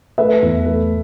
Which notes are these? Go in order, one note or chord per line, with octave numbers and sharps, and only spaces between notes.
A3 B4 E5
E2
A3